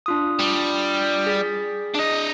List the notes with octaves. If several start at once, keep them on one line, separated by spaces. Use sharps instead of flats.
D4 F4 D#6
G3
G#4 A6 B6
D4 D#5